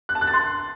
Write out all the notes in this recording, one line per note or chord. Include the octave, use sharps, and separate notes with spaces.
F#6
A5
F#6
A6
C6